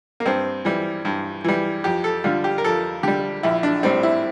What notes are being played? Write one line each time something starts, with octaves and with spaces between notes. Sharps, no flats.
A#3
G2 C4
E3 G3
G2
E3 G3
F2 G4
A4
D3 G3 F4
G4
A#4
F2 A4
D3 G3 G4
A#1 E4
D4
A2 G3 C4
E4